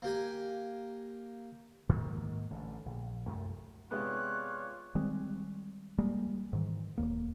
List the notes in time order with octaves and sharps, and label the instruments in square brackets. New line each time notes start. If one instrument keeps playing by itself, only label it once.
[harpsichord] A#3 G4 G#5
[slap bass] G#2 D#3 F#3 A#3
A1 D3 A3
A#1
C2 F#2 A3
[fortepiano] C3 G#3 B3 [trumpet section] F4 C#5 D5 [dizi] F#6
[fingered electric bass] D#3 G3 G#3 C4
G3 G#3 A#3
G#2 D#3 E3
D1 G#1 D#2 A#3